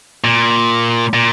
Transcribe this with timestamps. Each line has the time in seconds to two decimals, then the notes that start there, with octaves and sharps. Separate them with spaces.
0.24 A#2
1.14 A#2